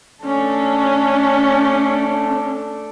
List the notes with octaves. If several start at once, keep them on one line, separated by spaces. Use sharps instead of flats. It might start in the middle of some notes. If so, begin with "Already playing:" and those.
A3 C#4 D4